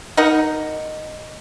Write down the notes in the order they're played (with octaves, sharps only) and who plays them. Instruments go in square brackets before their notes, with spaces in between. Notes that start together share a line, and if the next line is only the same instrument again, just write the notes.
[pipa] D#4 A#4 D#5 F#5